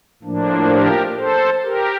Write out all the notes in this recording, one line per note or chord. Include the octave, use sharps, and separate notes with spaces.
A2 F3 A#3 D4
G4 A#4
A4 C5
G4 A#4